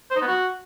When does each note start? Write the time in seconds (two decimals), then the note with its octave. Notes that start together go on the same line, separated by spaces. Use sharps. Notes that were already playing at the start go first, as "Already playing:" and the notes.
0.11 C5
0.16 D#4
0.22 B3
0.27 F#4